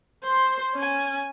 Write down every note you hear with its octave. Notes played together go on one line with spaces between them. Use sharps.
C5 C6
C#4 G#5